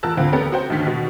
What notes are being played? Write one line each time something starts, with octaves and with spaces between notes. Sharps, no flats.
E2 F4 A#4 A5 E6 F#6
D2 D3 C4 F4 F5
B3 C#4 G4 A4 A#4
F#4 C5 G5
D#2 D3 D#3 B6
B2